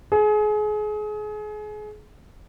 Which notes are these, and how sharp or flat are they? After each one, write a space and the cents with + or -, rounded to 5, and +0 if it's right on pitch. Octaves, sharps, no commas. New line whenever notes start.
G#4 +30